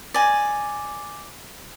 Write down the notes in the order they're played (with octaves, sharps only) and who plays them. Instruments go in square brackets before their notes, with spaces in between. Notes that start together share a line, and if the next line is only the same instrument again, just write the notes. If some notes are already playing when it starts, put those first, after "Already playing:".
[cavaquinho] D5 D#5 G#5